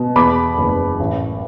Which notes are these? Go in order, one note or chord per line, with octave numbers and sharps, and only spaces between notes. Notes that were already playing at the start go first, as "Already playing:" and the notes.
Already playing: B2
E2 B5 D6
F#1
A1